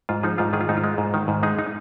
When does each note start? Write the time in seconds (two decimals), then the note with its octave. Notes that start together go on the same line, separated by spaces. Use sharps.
0.09 G#2 F4
0.23 F3 D#4 G#4
0.38 G#2 F4
0.53 D#3 G#4
0.61 F4
0.69 G#2 D#4
0.77 F4
0.84 G#3
0.98 G#2
1.14 D#3
1.28 G#2
1.43 G#3 D#4 G#4
1.59 D#4